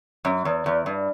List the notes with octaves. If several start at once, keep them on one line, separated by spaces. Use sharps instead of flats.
F#2
E2
E2
G2